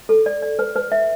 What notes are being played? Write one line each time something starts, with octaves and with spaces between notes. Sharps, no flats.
A4
D5
D5
B4
B4
E5